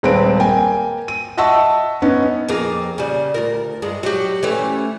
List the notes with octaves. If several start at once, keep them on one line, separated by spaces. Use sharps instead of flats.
D#1 G#3 C4 B4 F5 D7
A#3 G5 G#5
D#7
D#5 E5 F#5 A5 C#6 E6
B3 C#4 D#4
F2 A#3 G#4
C#3 G3
D2 F4 A#4
G2 G#3
F#3 G4
E3 A3 C#4